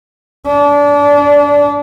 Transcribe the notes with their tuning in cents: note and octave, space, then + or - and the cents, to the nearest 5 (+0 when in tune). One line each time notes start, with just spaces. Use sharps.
D4 -25